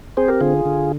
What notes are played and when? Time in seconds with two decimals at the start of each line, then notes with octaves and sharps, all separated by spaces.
0.17 C4 G#4 C5
0.28 G4 A#4
0.41 D3 F4 G#4
0.65 D3